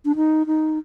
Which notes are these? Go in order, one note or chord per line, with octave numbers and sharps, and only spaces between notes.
D4
D#4
D#4